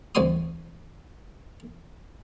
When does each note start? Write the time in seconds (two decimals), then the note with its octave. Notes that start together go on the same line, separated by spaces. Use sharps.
0.15 A1 D2 C4 G#5 C6 D#6